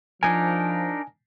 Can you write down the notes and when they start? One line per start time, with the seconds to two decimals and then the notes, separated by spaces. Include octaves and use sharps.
0.23 F3 D4 D#4 A#4 G#5